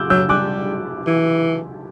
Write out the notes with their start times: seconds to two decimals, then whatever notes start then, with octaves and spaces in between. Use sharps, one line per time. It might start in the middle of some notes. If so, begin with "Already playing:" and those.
Already playing: D6 E6 F#6 G6
0.10 F#3 E6 G6
0.29 G3 D6 F#6
1.07 E3